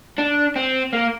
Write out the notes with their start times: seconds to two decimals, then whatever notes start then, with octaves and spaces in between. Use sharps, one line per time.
0.19 D4
0.56 C4
0.93 A#3